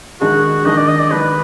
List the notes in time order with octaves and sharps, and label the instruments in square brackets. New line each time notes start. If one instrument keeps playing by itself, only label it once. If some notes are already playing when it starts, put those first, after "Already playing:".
[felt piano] D#3 G#3 D4 G#4 [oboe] F#4
[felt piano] D#3 G#3 D4 G#4 [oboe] D#5
[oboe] D5
D#5
D5
[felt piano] D#3 G#3 D4 G#4 [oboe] B4